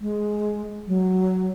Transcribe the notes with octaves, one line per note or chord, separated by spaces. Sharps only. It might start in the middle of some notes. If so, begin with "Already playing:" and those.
G#3
F#3